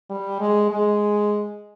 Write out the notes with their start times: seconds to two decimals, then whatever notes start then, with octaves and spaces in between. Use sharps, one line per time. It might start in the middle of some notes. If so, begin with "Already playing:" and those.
0.10 G3
0.40 G#3
0.71 G#3